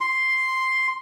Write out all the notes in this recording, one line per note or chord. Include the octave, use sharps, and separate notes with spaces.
C6